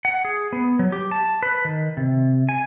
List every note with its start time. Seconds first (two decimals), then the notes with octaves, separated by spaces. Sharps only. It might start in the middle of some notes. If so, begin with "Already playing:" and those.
0.05 F#5
0.25 G#4
0.53 B3
0.79 F#3
0.92 G4
1.11 A5
1.43 B4
1.65 D#3
1.97 C3
2.49 G#5